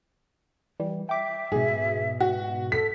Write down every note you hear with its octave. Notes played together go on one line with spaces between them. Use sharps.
E3 G3
E5 G5 D6
G#2 B2 G#4
F#4
A4 B6